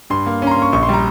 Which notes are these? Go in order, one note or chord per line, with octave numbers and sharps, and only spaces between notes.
G2 C6
A#3
C#4 A#5
C6
A#3
C#6
A#1 C#6
C6
G3 A#5